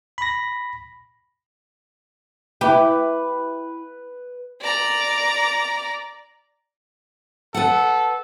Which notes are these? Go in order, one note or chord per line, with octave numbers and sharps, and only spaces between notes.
B5 A#6
E4 G4 B4
D5 A#5
A4 B4 F#5